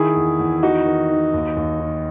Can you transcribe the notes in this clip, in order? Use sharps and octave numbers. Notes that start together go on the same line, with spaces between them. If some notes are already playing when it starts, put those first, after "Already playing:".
Already playing: D#3 E4 G#4
E2
E2
D#3 D#4 F#4
D#3
D#3
D#2
D#2
D#3